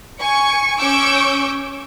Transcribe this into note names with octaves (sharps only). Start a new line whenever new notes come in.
G#5 C#6 C#7
C#4 C#6 D6 E6 G6 D7